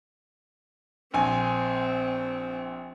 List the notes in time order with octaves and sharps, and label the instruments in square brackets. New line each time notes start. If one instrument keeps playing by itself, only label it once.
[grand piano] A#1 G#5 [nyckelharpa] C4